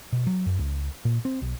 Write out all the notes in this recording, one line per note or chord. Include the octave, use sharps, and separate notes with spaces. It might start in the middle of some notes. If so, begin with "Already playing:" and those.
B2
F#3
F#2
C#2
A#2
C4
B1